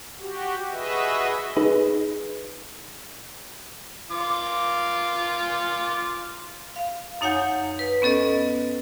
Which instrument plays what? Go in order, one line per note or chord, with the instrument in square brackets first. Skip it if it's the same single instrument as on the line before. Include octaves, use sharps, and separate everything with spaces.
[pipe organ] F#4 G4
F#4 G#4 B4 D#5 E5
[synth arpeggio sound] D#4 G#4 B4
[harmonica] F4 D6
[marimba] F5
F#2 D#4 C#5 F#5 G#5 G6
B4
B3 C#4 A4 D#5